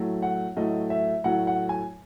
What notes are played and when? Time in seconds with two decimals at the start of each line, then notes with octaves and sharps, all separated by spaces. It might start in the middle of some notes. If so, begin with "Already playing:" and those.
Already playing: A2 F#3 A3
0.22 F#5
0.57 A2 F#3 A3 D#5
0.90 E5
1.24 A2 F#3 A3 F#5
1.47 F#5
1.69 G#5